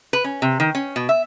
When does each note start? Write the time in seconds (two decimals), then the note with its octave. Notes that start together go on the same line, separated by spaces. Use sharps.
0.13 B4
0.24 C#4
0.42 C3
0.60 D#3
0.75 C#4
0.96 B2
1.09 E5